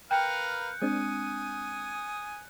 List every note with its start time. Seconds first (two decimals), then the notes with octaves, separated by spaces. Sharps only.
0.11 A#4 B4 F5 G5 F#6 G6 C#7
0.82 G#3 C4 D4 G#5 D#6